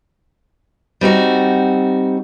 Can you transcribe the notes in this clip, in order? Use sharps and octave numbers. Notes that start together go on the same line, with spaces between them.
G3 C4 D#4 F#4